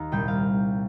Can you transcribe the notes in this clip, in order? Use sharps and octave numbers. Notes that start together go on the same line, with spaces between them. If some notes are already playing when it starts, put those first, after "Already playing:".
Already playing: D#2 D#3 F5 A#5
C2 A#2 G3 G5
F5